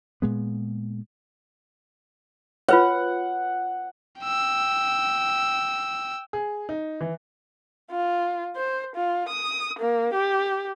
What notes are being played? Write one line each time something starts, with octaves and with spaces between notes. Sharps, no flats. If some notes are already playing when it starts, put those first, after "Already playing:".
A#2 G#3 B3
F4 B4 C#5 F#5
G5 E6
G#4
D#4
E3
F4
C5
F4
D#6
A#3
G4